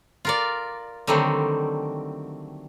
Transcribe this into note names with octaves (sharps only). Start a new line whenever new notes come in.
F4 A#4 D5
D3 D#3 F#3 G3 A3 C4